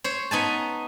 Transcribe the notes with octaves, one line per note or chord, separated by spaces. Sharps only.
C5 C#5
B3 D#4 G#5 A5